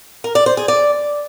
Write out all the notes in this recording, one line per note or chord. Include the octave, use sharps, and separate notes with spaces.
A#4
D5
C5
G#4
D5